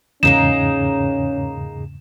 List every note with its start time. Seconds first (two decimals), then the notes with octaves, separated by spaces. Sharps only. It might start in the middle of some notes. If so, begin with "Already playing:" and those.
0.23 E2 G#2 C#3 G#3 A#3 C#4 D#4 E7